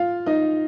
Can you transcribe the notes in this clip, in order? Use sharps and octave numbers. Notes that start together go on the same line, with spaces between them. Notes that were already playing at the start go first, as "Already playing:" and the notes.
Already playing: F4 F5
D#4 D#5